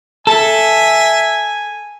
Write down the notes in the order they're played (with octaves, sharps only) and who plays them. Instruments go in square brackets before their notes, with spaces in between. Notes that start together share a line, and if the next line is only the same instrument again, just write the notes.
[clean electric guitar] A4 [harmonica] E5 [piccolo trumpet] G#5